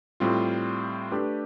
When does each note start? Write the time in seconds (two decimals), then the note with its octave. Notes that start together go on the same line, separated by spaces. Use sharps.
0.20 A2 G3 C4 F4
1.12 A3 D4 G4 B4